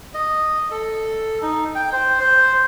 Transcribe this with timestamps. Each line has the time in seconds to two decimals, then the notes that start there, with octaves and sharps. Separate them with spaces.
0.14 D#5
0.71 A4
1.42 D#4
1.75 G5
1.92 C5
2.20 C5